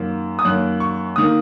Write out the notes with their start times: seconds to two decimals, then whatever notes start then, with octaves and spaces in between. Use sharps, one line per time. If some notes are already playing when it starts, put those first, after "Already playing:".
Already playing: F#2 D#3 A#3
0.39 D#6
0.45 F#2 D#3 A#3 F#6
0.80 C#6
1.16 D#3 A#3 D#6